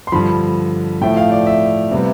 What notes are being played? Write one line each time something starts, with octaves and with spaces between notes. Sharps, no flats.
C6
G2 D3 F3 B5
A2 F3 A3 G5
F5
D5
E5
C3 G3 B3